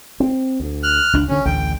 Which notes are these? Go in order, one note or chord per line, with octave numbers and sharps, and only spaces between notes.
C4
D2
F6 F#6
C#2 D4
D2 D3 C#4
A1 D2 D3 G5